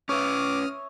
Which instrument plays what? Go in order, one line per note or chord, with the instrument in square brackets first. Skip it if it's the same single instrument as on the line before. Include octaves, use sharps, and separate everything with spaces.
[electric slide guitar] C#4 B4 [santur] C#5 E5 [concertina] D6 [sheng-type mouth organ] D#6 F6